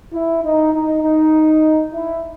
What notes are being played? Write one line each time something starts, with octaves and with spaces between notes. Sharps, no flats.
E4
D#4
D#4
D#4
E4